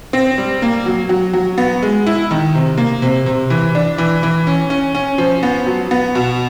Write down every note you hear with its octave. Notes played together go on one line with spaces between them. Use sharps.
C4
G3
A#3
F#3
F#3
F#3
B3
G#3
E4
D#3
C3
A#3
C3
C3
E3
D4
E3
E3
C#4
C#4
C#4
F3
B3
F#3
B3
B2